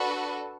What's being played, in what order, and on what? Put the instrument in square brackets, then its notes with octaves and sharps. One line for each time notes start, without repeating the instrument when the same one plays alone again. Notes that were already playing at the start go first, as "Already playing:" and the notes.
Already playing: [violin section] D4 F#4 A4 B4